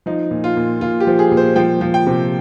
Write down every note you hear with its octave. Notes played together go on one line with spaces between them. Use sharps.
F3 D#4
A#2
F4
A#2
A#2 F4
G4
F3
G#4
A#2
C5
F3 G5
F3
G5
C3